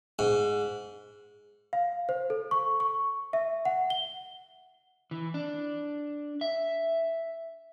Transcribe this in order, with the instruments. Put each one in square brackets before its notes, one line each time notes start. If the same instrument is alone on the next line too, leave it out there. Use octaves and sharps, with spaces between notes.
[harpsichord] G#2
[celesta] F5
C5
A4
C#6
C#6
E5
F#5
G7
[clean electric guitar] E3
D4
E5